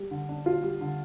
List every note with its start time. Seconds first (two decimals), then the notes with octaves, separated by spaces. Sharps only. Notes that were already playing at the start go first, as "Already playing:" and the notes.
Already playing: G3
0.11 D3
0.29 D4
0.46 F4
0.63 G3
0.81 D3